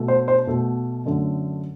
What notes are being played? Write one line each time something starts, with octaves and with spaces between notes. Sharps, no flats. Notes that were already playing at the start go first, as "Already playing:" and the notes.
Already playing: B2 A3
C5
C5
B2 A3
F#2 D3 A3